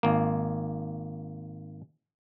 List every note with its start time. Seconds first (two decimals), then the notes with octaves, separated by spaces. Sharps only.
0.03 G#1 A#3